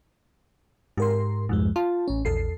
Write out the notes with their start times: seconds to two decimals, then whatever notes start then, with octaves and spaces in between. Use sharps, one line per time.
0.97 G#2 G4 A#4 C6
1.49 C2 F2 G#2 G#3
1.76 F4 A5
2.08 A1 C#4
2.25 A#1 E2 A4 C7